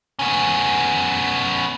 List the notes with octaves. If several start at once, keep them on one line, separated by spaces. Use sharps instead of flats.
B3 C#4